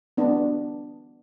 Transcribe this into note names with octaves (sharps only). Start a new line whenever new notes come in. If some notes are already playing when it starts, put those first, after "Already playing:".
B3 D4